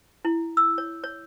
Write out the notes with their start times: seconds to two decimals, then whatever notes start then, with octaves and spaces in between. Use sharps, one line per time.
0.25 E4
0.57 E6
0.78 C#5
1.04 C#5